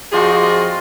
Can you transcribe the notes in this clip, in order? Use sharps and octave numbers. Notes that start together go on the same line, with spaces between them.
F3 G3 C4 F4 F#4 G#4 D#5 C6